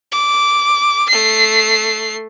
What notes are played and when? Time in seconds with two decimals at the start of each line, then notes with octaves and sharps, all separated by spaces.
0.12 D6
1.09 A3 C7